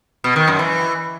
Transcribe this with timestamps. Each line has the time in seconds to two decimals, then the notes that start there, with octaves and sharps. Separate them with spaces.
0.24 B2
0.36 D#3
0.47 F#2
0.59 E3